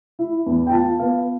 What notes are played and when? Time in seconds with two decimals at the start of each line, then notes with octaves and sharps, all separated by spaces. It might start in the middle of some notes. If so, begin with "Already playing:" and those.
0.19 E4
0.46 E2
0.67 G5
0.72 F4 A5
0.99 B3 F5